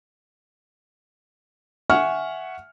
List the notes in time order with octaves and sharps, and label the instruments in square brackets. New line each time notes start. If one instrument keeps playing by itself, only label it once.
[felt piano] E5 F#5 G#5 C#6 F6